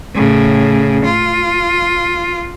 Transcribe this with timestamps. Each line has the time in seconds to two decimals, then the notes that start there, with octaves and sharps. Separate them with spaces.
0.15 A2 C#3
1.05 F4